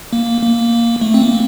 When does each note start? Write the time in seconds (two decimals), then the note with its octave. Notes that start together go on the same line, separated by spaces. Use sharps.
0.13 A#3
0.42 A#3
1.01 A3
1.14 C4
1.22 A#3